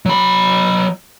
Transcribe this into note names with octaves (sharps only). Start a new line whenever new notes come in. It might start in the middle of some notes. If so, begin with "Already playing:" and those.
F#3 B5